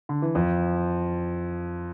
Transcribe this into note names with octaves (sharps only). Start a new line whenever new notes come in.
D3
E3
F2 F3